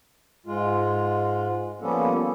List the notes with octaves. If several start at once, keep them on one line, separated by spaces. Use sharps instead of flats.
G#2 G#3 F4
F3 G3 A#3 B3 C#4 A4